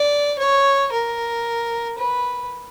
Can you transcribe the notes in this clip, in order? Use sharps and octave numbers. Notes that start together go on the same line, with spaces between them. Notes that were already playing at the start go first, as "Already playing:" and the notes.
Already playing: D5
C#5
A#4
B4